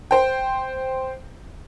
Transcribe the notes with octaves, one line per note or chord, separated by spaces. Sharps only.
C5 G5